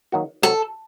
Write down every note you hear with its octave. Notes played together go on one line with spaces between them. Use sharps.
D#3 F#3 A#3 F#4
C3 F#3 C4 F#4 A4